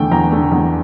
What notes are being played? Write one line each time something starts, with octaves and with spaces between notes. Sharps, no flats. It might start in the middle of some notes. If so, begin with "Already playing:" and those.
Already playing: E2 D3 A3 G5
E2 A#5
D3 A3
E2